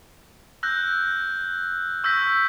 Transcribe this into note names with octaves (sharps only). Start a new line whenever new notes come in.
E6 F#6 G6 A#6
C#6 E6 G6 A#6 B6